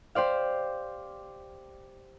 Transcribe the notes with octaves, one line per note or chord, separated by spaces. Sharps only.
G4 C5 D5 F5